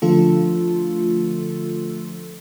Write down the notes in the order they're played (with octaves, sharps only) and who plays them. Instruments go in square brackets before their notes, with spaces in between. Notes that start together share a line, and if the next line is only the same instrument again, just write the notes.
[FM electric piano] D3 F3 A3 F4 A4